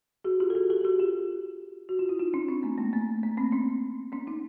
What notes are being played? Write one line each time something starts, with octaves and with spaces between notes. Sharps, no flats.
F#4 G#4
F4 G4
A4
F#4 G#4
G4 A4
G4
F#4 G#4
F4 G4
F#4
F4
E4
D#4 F4
C#4 D#4
C4 D4
A3 B3
G#3 A#3
A3 B3
A3 B3
A#3 C4
B3 C#4
B3 C#4
C#4 D#4